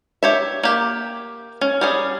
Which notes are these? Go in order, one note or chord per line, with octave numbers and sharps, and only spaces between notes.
G4 C#5 E5
A#3 G4
C#4
G3 C#4 G#4